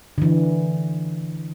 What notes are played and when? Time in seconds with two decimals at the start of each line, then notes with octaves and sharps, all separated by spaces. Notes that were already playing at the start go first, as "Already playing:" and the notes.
0.18 D3 E3